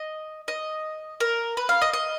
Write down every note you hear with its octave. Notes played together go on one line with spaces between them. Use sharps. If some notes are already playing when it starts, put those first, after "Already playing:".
Already playing: D#5
D#5
A#4
B4
F5
D#5
D#5